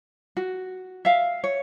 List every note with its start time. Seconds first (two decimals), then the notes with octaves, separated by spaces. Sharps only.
0.37 F#4
1.05 E5 F5
1.44 C#5